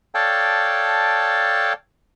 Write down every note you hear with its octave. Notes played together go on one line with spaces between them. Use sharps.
A4 C#5 D5 F5 G5 A5